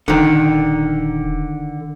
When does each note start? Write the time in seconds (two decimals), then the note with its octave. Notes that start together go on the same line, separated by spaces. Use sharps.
0.08 D#1 D3 D#3